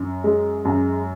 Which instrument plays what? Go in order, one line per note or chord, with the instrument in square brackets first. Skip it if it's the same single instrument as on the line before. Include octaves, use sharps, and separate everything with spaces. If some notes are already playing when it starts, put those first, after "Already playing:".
Already playing: [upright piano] F#2
G#3
F#2